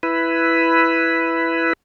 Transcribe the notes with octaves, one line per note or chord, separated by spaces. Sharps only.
E4 B4